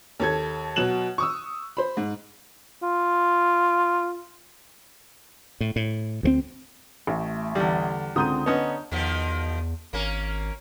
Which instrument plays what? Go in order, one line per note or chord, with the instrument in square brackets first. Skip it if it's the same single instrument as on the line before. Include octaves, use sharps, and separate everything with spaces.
[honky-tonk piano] D#2 A4 G#6
B2 F#3 F#4 F#6 E7 F#7
C#6 D#6 E6
C5 B5
G#2
[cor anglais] F4
[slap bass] A2
A2
D2 E3 C4
[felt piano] A1 [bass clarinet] A3
[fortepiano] E2 G3 [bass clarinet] D3
[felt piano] C#2 G6 D#7 [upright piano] D3 A#5 D#6 [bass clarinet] C4
[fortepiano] B3 C#4 [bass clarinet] D4 [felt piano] C#5 D#5
[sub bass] E2 [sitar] B2 D#3 F3
[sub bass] G#1 [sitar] A#3 C#4 A#4